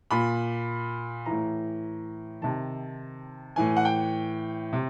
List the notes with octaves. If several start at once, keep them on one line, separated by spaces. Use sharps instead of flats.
A#2 B5
A2 E3 A#5
C3 D#3 A5
A2 E3 G#5
F#5
G5
C3